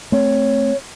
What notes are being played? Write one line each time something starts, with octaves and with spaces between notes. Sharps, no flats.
A3 C4 C#5